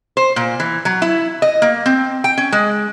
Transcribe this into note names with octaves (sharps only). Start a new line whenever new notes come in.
C5
A#2
E3
F#3
E4
D#5
A#3
C4
G5
C#4
G#3